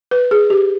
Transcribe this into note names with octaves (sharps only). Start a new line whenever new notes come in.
B4
G#4
G4